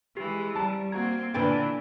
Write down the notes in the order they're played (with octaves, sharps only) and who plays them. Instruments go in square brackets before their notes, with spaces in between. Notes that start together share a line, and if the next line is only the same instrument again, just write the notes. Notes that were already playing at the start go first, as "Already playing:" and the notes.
[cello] E3 G#3 [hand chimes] G4
[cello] G3 [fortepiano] A5 A#5
[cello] A#3 C4 [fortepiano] F#4 A#5 [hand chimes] G#6
[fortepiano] A#2 B3 G5 [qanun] D3 B4 D5 [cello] E3 D4